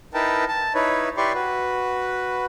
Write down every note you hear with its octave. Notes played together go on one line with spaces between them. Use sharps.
D#4 E4 A#4 B4 G5 A5
A5
D#4 E4 B4 C#5
E4 G4 B4 D5 C6 C#6
F#4 B4